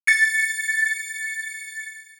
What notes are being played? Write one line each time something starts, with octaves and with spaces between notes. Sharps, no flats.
A6 C#7